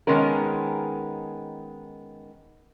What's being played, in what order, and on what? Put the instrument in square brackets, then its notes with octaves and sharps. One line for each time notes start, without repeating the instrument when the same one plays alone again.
[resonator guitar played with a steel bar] D#3 G#3 B3 C#4 A#4